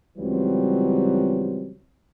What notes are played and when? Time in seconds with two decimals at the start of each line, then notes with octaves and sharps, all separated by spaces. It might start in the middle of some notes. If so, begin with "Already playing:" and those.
0.18 C#2 E3 F#3 G3 C4